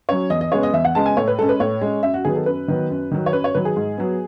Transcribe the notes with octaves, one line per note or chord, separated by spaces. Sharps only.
F#3 C#4 C#5
E2 D#5
D#5
C#3 G#3 B3 C#5
D#5
E2 E5
F#5
C#3 G#3 B3 A5
G#5
A2 C#5
B4
G#3 C#4 A4
B4
A2 C#5
G#3 C#4
F#2 E5
F#4
D#3 F#3 B3 G#4
A4
F#2 B4
D#3 F#3 B3
F#2
D#3 F#3
C#5
F#2 B4
C#5
D#3 F#3 B4
G#4
G#2
F#3 B3